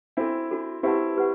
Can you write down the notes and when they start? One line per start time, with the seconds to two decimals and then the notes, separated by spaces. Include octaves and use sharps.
0.17 C4 D4 E4 F#4 A4
0.51 D4 F#4 A4
0.83 C4 E4 G4 B4 F#5 A5
1.17 G4 B4 F#5